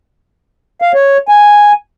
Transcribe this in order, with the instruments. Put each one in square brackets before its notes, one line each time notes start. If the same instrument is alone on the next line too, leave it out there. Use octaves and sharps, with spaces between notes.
[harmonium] F5
C#5
G#5